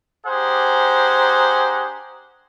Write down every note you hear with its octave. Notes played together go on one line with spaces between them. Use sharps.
D4 G4 G#4 C5 F#5 A#5